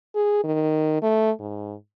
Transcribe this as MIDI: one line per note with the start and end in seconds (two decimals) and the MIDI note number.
0.15 0.40 68
0.44 1.00 51
1.02 1.31 57
1.39 1.75 44